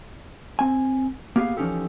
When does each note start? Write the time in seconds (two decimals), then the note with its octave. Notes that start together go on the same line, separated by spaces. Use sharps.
0.59 C4 G#5
1.36 A#3 B3 G4 G#4 F5
1.57 E3 F3 C#4 D#4 G4 A4